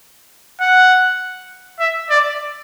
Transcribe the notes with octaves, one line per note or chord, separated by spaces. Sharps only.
F#5
E5
D5